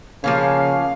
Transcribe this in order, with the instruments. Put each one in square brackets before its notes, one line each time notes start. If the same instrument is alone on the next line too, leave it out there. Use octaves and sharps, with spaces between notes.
[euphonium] C#3 [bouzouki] F3 A#3 C#4 [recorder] F5